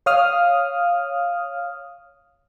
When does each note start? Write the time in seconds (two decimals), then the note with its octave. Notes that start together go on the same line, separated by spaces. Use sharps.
0.06 C#5 F5 D#6 F6